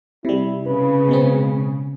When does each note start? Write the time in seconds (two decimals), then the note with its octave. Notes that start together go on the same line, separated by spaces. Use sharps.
0.25 C3 G3 E4
0.67 C#3 B4
1.09 B2 G#3 C4